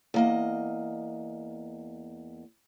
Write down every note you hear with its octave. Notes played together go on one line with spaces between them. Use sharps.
E2 A#3 D#5